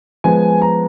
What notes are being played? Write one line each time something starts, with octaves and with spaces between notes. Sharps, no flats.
F3 G#3 B3 G#5
A#5